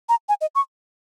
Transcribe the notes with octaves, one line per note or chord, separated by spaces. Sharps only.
A#5
G#5
D#5
C#6